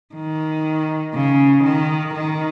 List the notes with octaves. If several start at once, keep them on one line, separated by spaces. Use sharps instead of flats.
D#3
C#3
D#3
D#3